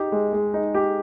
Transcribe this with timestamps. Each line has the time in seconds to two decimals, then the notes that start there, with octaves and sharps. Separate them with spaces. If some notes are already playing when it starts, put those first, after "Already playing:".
Already playing: D#4 G4
0.12 G#3
0.33 G#3
0.54 D#4
0.75 G4